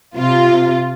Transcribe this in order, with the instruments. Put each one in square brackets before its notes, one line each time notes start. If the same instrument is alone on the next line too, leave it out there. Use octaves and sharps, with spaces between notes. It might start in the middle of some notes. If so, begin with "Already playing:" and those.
[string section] C3 F4